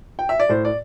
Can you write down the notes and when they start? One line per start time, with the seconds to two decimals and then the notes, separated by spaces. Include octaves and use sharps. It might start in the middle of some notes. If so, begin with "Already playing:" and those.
0.19 G5
0.29 E5
0.40 D5
0.49 A2 C5
0.65 D5